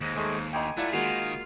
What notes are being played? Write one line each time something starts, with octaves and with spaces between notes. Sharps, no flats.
D#2 G#2 D#5
D#2 G#3 A3 G#4
D2 D#5 G5 G#5
F#3 A3 E4 F4 D5
D#3 G#3 A#3 F4 F#4